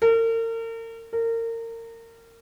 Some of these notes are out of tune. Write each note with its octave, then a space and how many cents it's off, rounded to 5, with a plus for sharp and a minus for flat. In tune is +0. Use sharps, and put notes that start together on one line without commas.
A#4 -40
A#4 -30